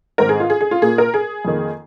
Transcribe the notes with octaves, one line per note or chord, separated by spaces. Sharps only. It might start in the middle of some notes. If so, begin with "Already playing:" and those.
G#2 D#3 C4 A#4
G#4
F4
G#4
G#4
F4
A#2 A#3 G#4
A#4
G#4
F2 D#3 A#3